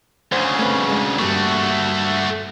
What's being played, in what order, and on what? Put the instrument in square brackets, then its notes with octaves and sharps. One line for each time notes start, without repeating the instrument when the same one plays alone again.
[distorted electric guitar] D2 C#3 [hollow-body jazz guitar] C5
[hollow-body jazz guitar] A3 C4 B4
G#3
[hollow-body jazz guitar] G2 G3 A#3 [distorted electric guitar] A3 F#4